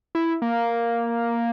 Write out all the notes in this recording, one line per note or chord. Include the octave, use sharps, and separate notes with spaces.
E4
A#3